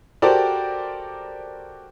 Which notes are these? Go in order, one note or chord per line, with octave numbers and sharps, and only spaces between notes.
F#4 G4 A4 A#4 C5 D5